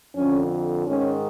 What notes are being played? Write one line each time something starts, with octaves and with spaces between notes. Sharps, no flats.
F2 D3 C#4
G#2 D#3 C#4